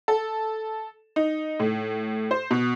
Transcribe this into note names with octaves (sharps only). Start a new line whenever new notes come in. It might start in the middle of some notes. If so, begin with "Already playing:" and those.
A4
D#4
A2
C5
B2